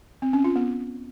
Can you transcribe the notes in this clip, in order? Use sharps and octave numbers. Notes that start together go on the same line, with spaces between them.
C4
C#4
F4
B3